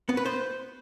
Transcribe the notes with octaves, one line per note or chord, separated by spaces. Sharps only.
B3
B4
C5